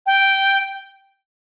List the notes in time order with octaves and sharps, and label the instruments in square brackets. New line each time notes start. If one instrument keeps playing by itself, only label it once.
[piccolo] G5